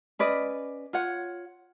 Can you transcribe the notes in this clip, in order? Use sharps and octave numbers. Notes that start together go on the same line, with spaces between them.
C#4 B4 D5 D#5
F4 C#5 F#5